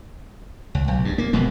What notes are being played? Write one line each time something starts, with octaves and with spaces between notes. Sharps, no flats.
C#2
B1
G2
A#3
F1 B2 G#3 B3